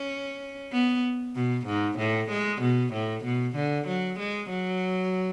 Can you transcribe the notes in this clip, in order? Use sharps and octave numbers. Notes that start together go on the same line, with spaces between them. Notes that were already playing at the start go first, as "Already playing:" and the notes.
Already playing: C#4
B3
B2
G#2
A2
G#3
B2
A2
B2
D3
F#3
G#3
F#3